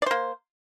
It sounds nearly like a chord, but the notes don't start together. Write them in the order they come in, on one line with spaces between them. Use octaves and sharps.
D5 C5 A#3